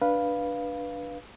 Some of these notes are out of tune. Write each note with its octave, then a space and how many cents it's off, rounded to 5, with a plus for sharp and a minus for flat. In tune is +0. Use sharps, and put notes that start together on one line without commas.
D4 +0 B4 -10 F5 +0